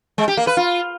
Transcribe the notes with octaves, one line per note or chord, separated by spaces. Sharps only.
G#3
G4
A#3
B4
F4